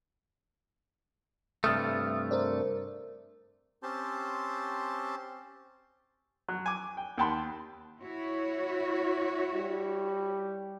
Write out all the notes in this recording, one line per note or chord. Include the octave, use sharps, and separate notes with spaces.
G2 C3 A3 D#6 F6 A6
A#4 C5 D5
C4 C#4 G4 C5 A5 C6
F#3
G#5 D6
G5
D#2 F#5 G5 A5 B5 C6
E4 F#4 C#5
G3